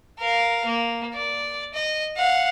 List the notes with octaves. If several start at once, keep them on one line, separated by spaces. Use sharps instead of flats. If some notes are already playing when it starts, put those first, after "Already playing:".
A#4 F5
A#3
D5
D#5
F5 F#5